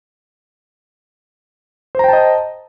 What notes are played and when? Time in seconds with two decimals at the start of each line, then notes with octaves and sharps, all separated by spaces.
1.95 C5
1.99 A#5
2.04 G5
2.09 A5
2.13 D#5